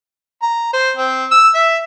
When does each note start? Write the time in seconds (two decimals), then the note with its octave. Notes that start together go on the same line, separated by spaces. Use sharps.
0.42 A#5
0.73 C5
0.97 C4
1.31 E6
1.55 E5